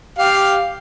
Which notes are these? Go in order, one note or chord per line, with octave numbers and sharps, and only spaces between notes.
G4 F5